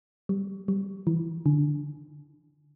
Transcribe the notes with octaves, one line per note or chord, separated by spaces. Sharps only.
G3
G3
E3
D3